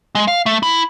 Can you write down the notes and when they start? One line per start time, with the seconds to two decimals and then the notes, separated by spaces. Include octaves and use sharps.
0.15 G#3
0.28 F5
0.46 A3
0.63 E4